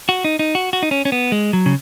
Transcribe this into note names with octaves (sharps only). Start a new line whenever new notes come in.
F#4
D#4
D#4
F#4
F#4
D#4
C#4
C#4
B3
G#3
F#3
C#3